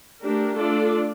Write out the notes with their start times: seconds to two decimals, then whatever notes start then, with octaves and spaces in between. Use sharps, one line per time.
0.21 A3 D4 G4 A#4
0.57 A3 D4 F4 A4 D5